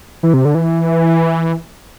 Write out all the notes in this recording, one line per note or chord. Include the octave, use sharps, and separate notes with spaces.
E3
C3
D3
E3